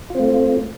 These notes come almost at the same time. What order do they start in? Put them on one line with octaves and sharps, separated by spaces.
F4 C4 A3